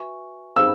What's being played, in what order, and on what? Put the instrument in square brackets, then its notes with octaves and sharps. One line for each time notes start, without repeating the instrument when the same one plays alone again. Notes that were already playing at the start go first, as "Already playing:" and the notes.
Already playing: [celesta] F#4 B4 E5 G#5 C#6
[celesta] D#4 G#4 C5 F5 [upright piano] E6